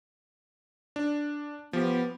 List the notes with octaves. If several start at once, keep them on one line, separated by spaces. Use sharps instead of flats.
D4
F3 B3 G4